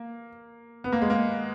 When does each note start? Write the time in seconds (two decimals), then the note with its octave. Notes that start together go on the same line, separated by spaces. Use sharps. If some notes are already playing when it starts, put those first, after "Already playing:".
Already playing: A#3
0.84 B3
0.92 A#3
1.02 G#3
1.10 A#3